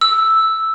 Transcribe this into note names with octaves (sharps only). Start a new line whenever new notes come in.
E6